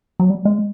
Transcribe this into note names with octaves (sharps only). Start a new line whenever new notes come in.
F#3
G3
G#3